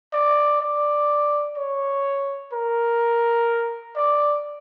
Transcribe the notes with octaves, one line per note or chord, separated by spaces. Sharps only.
D5
D5
C#5
A#4
D5